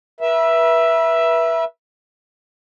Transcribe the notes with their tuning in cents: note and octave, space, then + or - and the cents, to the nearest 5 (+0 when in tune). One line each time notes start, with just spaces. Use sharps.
B4 -35 E5 +5